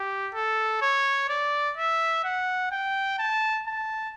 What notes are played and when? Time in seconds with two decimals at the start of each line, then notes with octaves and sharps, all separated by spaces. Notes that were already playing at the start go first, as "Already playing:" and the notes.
Already playing: G4
0.34 A4
0.82 C#5
1.29 D5
1.77 E5
2.24 F#5
2.71 G5
3.19 A5
3.67 A5